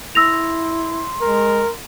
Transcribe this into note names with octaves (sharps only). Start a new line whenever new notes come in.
E4 C6 E6 A#6 F7
G#3 A#4